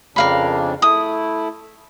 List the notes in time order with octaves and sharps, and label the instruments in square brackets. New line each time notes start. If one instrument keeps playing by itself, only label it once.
[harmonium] F2 C#3 D4 [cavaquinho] A#4 F5 B5
[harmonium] A3 E4 [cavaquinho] D#6